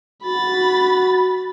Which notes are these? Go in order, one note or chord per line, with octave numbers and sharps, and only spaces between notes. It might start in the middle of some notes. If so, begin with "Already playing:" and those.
F#4 B5 A6